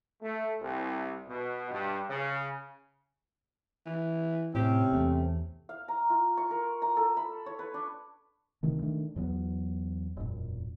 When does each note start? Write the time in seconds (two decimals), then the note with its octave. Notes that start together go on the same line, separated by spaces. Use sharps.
0.22 A3
0.61 C2
1.28 B2
1.71 G2
2.10 C#3
3.86 E3
4.55 A2 C3 C4 C#4 G4
4.93 E2 A3
5.69 F5
5.88 A#5
6.10 F4
6.37 C#6
6.51 A#4
6.82 A#5
6.97 A4
7.17 B5
7.46 C#5
7.59 B4
7.74 D4
8.63 D2 C3 D#3 A3
8.82 D#3 A3 D4
9.16 E2 F#3 G#3 B3
10.17 E1 F#2 A#2